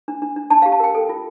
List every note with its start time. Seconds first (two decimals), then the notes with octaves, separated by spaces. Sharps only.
0.08 D4
0.22 D4
0.36 D4
0.50 D4 A5
0.62 G4 F5
0.72 A5
0.80 A#4 G5
0.95 A4
1.09 F4